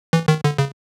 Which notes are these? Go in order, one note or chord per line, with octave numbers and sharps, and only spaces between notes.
E3
D#3
D3
C#3